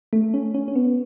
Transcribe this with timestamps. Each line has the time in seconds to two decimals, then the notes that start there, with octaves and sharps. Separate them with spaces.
0.13 A3
0.34 C#4
0.54 C#4
0.68 C#4
0.75 B3